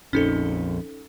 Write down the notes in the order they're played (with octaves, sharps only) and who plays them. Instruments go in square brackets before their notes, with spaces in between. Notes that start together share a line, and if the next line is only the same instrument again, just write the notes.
[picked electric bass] A#1 F2 [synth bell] C#4 D#4 A4